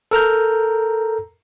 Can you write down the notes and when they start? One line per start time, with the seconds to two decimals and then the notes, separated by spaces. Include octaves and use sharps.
0.11 A4 A#4 A#5 G6